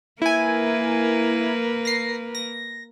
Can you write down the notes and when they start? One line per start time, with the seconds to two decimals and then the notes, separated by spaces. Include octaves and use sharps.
0.22 A#3 E4 A#4 B4 G#5
1.85 A#6 C7
2.35 A#6